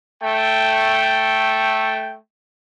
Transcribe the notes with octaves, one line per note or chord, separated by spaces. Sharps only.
A3 G5